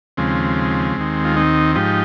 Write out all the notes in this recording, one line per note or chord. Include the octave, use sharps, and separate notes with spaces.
D#2 C#3 F3 G#3 C4
D#2 D#3
F4
C4 D#4
G#2 F3 D#4 G4